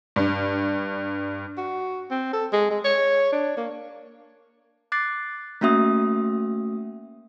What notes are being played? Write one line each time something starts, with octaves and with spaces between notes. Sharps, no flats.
G2
F#4
C4
A4
G#3
G#3
C#5
D4
A#3
D6 F#6 A6 C7
A3 A#3 C#4 F#4 E5 D#6